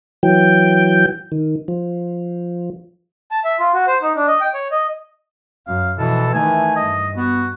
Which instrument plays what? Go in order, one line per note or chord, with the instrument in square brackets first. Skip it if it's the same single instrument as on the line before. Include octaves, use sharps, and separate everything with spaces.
[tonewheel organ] E3 F#3 G5
D#3
F3
[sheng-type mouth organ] A5
E5
F4
F#4
C5
D#4
D4
D#5
G5
C#5
D#5
[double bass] F#2 [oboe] F5
[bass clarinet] B2 [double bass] E3 F3 [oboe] A4
[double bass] D#3 E3 [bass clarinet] A3 [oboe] G#5
[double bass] G2 [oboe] D#5
[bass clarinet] B3 [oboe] F#4